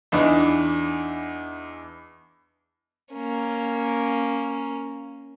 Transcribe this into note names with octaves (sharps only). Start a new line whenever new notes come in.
E2 E3 D4 D#4
A#3 C#4